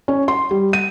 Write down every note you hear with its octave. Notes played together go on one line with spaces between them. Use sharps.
C#4
C6
G3
D#7